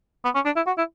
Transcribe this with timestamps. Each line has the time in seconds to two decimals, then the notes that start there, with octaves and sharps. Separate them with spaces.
0.24 B3
0.35 C#4
0.45 D4
0.56 E4
0.67 F#4
0.78 E4